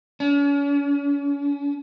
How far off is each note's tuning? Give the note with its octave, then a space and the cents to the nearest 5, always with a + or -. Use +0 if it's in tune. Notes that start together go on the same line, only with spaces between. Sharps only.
C#4 +40